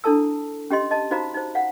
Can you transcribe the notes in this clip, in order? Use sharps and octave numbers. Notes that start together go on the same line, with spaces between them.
D4 E4 A4 A5 E6
C#4 G4 D#5 C6
D#5 A5
D#4 F#4 C5 F5 A#5 B5
D#4 C5
F5 F#5